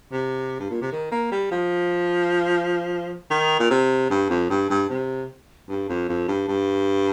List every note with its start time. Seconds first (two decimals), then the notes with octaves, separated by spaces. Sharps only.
0.12 C3
0.60 G2
0.70 A#2
0.81 C3
0.92 D#3
1.12 A#3
1.31 G3
1.51 F3
3.30 D#3
3.59 A#2
3.70 C3
4.10 G2
4.30 F2
4.50 G2
4.70 G2
4.89 C3
5.69 G2
5.89 F2
6.09 F2
6.28 G2
6.48 G2